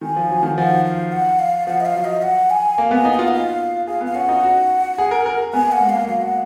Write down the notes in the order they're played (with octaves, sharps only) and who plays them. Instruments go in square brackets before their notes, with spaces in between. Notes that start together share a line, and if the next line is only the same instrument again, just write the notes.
[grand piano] D#3 [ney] G#5
[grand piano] F3
F#3
D#3
[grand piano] F3 [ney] F#5
[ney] F5
F#5
F5
[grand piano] F3 [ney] F#5
[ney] D#5
F5
[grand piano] F#3
[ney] D#5
F#5
G#5
[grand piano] A#3
B3
[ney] G#5
[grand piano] D#4
[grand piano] F4 [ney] F#5
[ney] D#5
F5
[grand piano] G#4 [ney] F5
[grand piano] B3
[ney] F5
[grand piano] C#4 [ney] F#5
[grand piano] D#4
F#4
G#4
A#4
A#4
[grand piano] B3 [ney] G#5
[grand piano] A#3
[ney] F#5
[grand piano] G#3
[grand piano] A#3 [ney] F5
[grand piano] F#3 [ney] F5
[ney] F#5